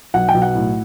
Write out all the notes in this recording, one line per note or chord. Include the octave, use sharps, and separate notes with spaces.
B1 F#5
G5
B1
F#5
A2